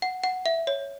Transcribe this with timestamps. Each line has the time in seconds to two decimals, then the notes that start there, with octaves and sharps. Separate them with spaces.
0.02 F#5
0.24 F#5
0.46 E5
0.67 C#5